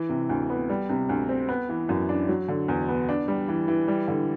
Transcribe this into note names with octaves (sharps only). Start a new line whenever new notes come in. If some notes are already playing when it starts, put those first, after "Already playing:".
Already playing: E3
C3
D2
B3
G3
C3
D2
C4
B3
E3
F#2
D4
F#3
D3
E2
B3
D4
G3
E3
E3
G3
D3